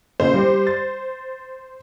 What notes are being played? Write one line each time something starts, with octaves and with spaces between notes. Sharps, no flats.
A#2 C#3 E4 C5
G3 G4
A6